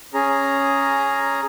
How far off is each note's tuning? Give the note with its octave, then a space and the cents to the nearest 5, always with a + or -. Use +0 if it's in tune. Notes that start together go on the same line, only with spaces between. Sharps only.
C#4 +0 G#4 +0 A#5 +0